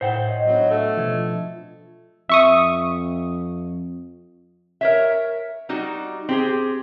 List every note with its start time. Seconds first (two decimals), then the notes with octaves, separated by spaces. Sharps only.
0.01 A2 C5 F#5 G5 E7
0.27 C#5 D#5
0.46 F#3 B3 D4
0.70 A3
0.97 B2 F3 G#6
2.29 F2 E5 C#6 D#6
4.81 A#4 C#5 E5
5.69 G3 D#4 F#4
6.29 C4 G4 G#4